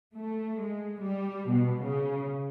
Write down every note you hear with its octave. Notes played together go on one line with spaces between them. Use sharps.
A3
G#3
G3
B2
C#3